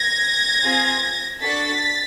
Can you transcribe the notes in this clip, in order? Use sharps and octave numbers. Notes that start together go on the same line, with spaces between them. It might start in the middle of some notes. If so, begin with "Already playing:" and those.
Already playing: G#6 A#6
C4 F4 G#4
D4 F#4 A4 A6 B6